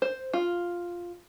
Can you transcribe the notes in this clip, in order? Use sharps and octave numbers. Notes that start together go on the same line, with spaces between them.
C5
F4